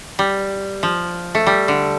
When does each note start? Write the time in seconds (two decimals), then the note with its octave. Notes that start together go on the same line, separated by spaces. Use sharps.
0.19 G3
0.83 F3
1.35 A3
1.46 G3
1.68 D3